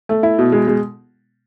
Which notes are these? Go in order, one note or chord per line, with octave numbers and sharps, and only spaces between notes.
A3
E4
B2
G#3
G#3